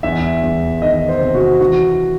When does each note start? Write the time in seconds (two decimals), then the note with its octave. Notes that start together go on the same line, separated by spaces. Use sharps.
0.03 E2 E5
0.43 E2
0.82 D#3 D#5
1.09 C5
1.21 C3
1.35 F#4
1.61 E3 F#4